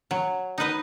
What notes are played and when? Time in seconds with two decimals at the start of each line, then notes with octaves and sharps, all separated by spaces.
0.11 F#3
0.58 D#4 B4 D#5